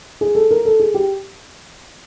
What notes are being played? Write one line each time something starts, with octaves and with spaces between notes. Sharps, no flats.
G#4
A4
A#4
A4
G#4
G4